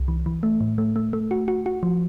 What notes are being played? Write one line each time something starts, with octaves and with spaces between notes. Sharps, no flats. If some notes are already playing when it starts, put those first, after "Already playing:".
Already playing: C2
E3
E3
A3
A2
A3
A3
A3
F#4
F#4
F#4
F3